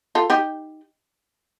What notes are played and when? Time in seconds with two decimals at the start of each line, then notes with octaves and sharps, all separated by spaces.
0.15 F4 A4
0.30 D#4 G4